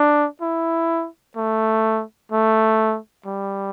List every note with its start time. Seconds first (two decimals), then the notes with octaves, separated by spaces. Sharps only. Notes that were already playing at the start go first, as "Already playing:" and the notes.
Already playing: D4
0.41 E4
1.36 A3
2.32 A3
3.26 G3